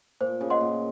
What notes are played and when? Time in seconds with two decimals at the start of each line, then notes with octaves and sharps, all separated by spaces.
0.20 A#2 C5
0.41 C#3
0.50 D#5 F#5 C6
0.61 A#2